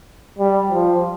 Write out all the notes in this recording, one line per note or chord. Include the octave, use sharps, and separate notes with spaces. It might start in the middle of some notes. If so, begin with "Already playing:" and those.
G3
F3